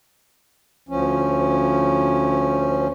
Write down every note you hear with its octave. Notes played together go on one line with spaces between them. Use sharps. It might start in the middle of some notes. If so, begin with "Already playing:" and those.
D2 F3 C#4